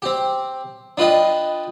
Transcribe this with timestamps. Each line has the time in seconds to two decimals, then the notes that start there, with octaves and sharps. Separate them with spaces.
0.02 C4 G4
0.97 D4 F4 B4 D#5 G5